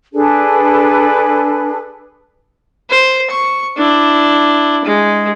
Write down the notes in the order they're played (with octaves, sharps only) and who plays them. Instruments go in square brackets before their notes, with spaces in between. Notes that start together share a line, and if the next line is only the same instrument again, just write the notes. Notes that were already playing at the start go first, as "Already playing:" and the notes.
[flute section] D4 G#4 A4 B4
[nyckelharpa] C5
C#6
D4 E4
G#3